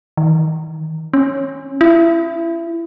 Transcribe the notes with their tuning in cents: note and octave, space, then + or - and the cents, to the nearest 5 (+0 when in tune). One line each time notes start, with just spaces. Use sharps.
D#3 +40
C#4 -15
E4 +25